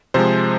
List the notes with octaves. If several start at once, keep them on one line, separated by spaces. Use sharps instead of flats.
C3 F3 G#3 C5